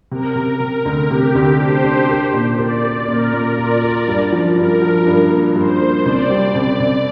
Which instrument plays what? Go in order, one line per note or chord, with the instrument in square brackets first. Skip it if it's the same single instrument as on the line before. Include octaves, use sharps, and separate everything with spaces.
[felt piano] C3 [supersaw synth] A#4
[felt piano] C3
C3
D2
[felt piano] C3 [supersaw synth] G4
[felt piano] D2
[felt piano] D4 [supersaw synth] C5
[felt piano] D4
A#4
A#2
[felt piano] A#4 [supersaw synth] D5
[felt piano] A#3
[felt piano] A#2 [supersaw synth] A#4
[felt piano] A#2
[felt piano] F4 [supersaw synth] D5
[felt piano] A#4
G2
F3
[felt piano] G2 [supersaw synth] A#4
[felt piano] F3
G2
A#3
[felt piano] G2 [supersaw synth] C5
[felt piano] A#3
[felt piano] C2 [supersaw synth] D5
[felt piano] G3
[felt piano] C2 [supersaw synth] D5
[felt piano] C2